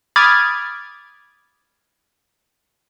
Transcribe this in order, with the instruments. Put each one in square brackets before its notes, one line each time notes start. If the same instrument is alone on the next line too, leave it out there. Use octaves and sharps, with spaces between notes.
[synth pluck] B5 D6 D#6 F6 G#6 A6